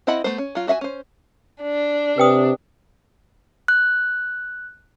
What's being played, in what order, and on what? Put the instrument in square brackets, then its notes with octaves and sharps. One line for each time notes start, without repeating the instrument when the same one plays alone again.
[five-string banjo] C4 E4 D#5 F#5 B5
A3 B3 C5
C#4
F#3 F4
F#4 E5 F5 G#5
C#4 C5
[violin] D4
[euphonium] C3 [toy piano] B4 G5 D#6
[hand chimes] F#6